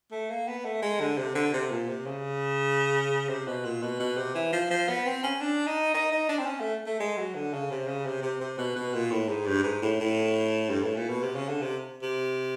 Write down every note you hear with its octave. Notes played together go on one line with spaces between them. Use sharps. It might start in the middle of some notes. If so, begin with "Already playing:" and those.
A3
A#3
B3
A3
G#3
D3
C3
D3
C3
A#2
C3
C#3
C3
B2
A#2
B2
B2
C3
E3
F3
F3
B3
C4
C#4
D4
D#4
D#4
D#4
D4
C4
C#4
A3
A3
G#3
F#3
D3
C#3
C3
C#3
C3
C3
C3
B2
B2
A#2
A2
G#2
G2
G#2
A2
A2
G2
A2
A#2
B2
C3
C#3
D3
C3
C3